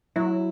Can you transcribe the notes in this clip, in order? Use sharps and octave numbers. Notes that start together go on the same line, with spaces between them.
F#3 E4